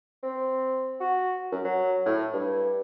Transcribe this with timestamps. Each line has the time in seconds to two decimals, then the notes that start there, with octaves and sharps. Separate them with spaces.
0.23 C4
1.01 F#4
1.52 F#2
1.65 F#3
2.06 A2
2.34 G2